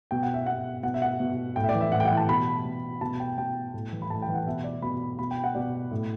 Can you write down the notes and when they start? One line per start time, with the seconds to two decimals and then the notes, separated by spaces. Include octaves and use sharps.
0.11 B2 G5
0.23 F#5
0.34 E5
0.46 B2 F#5
0.83 B2 F#5
0.94 E5
1.02 F#5
1.20 B2
1.56 A2 G5
1.64 E5
1.69 D5
1.75 E3
1.81 E5
1.92 A2 F#5
2.00 G5
2.05 F#5
2.11 E3
2.17 A5
2.28 B2 B5
2.65 B2
3.01 B2 A5
3.20 G5
3.38 B2 G5
3.74 A2
3.93 E3
4.02 B5
4.10 A2 A5
4.22 G5
4.28 E3
4.34 F#5
4.47 B2 E5
4.64 D5
4.82 B2 B5
5.19 B2 B5
5.31 G5
5.44 F#5
5.55 B2 D5
5.91 A2